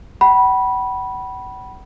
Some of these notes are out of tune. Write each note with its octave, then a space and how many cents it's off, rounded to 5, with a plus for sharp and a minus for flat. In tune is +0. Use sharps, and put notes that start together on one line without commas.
F#5 +45 B5 -15